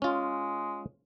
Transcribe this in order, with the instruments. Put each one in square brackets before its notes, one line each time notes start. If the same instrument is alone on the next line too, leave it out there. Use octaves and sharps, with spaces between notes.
[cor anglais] G#3 [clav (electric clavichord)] C#4 F4